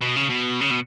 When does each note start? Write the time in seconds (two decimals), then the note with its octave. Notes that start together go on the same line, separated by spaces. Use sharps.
0.02 B2
0.16 C#3
0.30 B2
0.61 C#3
0.71 B2